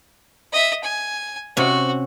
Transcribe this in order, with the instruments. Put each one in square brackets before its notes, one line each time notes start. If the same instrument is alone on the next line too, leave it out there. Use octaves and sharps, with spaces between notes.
[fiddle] D#5 E5
G#5
[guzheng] C3 C#4 [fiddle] F#4